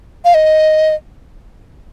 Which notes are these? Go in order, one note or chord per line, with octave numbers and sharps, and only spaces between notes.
F5
D#5